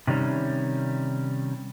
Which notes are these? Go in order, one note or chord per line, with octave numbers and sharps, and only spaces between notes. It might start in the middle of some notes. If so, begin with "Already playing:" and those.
C3 D#3 G3 C#4